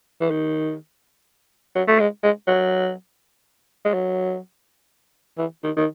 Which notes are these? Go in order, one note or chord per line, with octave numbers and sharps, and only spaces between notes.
E3
D#3
F#3
A3
G#3
G#3
F#3
G#3
F#3
E3
D#3
D#3